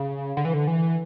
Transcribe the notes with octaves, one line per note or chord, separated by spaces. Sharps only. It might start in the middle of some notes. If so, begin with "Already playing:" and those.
Already playing: C#3
D3
E3
D3
E3